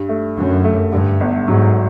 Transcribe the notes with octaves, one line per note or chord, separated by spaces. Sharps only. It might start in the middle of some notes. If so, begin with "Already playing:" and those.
Already playing: G2
A3
F#2 D3
A3
G2 D3
G1
G#2 F#3